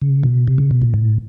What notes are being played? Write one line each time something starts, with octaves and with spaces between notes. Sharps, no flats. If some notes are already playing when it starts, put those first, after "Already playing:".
C#3
B2
C3
C#3
B2
A#2
A2